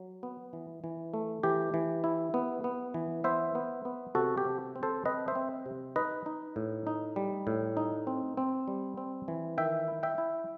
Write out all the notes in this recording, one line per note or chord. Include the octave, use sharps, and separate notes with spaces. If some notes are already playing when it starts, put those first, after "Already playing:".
Already playing: F#3
B3
E3
E3
A3
E3 G4
E3
E4
B3
B3
E3
B3 C5 E5
B3
B3
C3 F#4 A4
G4
C3
C4
A4 C5
C4 B4 D#5
C5 E5
C4
C3
D#4 B4 D#5
D#4
A2
D#4
G3
A2
D#4
C4
C4
G3
C4
E3
D#3 E5 G5
E4
E5 G5
E4